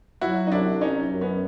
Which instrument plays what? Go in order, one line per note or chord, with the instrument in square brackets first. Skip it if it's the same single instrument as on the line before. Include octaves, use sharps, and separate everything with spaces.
[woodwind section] F#3 [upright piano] E4 F#4
[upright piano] D#4
[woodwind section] C2 [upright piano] D4 E4
[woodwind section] F#3 [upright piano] C#4 D#4
[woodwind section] F#2
[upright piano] B3 C#4